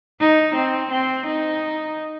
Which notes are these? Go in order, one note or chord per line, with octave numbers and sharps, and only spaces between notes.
D#4
C4
C4
D#4